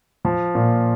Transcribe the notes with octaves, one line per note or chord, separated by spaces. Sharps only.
F3
A#2